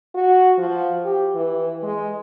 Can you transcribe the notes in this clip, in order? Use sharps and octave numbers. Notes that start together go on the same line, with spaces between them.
F#4
F3
G4
E3
G#3